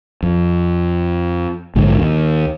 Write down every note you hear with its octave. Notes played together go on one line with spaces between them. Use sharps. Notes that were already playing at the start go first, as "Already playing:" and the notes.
F2
A#1 G#2 D3
D#2